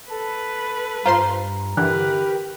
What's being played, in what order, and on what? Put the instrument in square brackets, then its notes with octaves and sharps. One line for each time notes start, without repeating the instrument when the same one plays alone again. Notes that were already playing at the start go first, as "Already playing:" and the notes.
[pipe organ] A4 [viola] B4
[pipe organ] G2 [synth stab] F4 C5 C6 [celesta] A#5
[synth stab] D3 E3 [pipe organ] G4 [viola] A#4 B4 [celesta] F#6